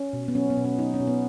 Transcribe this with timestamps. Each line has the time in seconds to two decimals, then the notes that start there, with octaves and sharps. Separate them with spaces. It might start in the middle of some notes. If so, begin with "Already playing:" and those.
Already playing: C#4
0.13 B2
0.28 B3
0.35 F#3 C#4
0.50 B3
0.57 B2
0.64 C#4
0.79 F#3 D#4
0.94 C#4
1.00 B2
1.07 B3